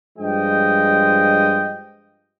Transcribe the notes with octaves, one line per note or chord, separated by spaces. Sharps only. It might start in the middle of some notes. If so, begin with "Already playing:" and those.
G2 F3 G#3 D#5 G5